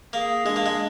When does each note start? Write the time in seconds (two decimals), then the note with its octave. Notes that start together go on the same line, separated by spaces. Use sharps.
0.13 A#3 G#4
0.46 G#3 D4
0.56 A#3
0.66 G#3